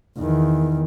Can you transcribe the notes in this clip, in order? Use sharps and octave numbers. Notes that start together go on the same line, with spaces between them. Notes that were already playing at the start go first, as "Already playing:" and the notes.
E2 D#3